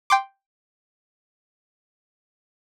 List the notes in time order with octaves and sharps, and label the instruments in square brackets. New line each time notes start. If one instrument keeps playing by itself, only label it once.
[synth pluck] G5 C6 D6